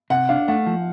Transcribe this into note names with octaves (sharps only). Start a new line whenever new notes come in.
C3 F#5
D4 F5
A3 F#5
F3